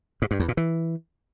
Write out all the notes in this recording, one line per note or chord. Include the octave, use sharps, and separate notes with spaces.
G#2
G2
E2
A#2
E3